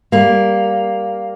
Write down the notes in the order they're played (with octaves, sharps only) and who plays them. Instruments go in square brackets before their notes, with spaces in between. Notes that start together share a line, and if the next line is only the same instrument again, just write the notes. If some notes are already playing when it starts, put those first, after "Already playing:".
[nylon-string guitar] G3 A#3